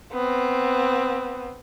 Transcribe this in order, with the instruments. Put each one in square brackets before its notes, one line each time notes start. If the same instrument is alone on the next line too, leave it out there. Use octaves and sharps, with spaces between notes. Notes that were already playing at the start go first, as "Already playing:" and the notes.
[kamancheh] B3 C4